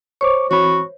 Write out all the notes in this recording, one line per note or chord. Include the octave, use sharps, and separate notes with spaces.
C5 C#5 C#6 D6
E3 C4 F#4 C#5 B5